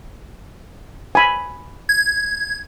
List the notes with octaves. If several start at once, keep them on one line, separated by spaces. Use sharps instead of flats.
G#5 B5
G#6